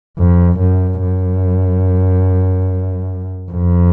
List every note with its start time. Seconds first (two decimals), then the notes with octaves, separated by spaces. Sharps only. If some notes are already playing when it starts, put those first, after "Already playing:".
0.19 F2
0.60 F#2
1.02 F#2
3.53 F2